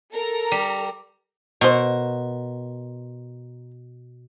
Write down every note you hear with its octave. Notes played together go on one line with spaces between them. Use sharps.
A4 A#4 A#5
G3
B2 A#4 C5